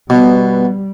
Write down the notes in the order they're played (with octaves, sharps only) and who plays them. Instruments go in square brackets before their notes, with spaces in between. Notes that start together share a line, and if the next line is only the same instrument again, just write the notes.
[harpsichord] B2 [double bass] G3 [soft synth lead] B3